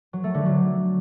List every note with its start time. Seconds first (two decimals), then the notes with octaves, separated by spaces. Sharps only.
0.13 F#3
0.24 A3
0.34 D3
0.45 F#3